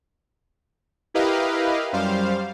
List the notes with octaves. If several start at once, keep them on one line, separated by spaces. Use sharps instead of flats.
E4 G4 A#4 B4 D#5 F5
F#2 G3 C5 F5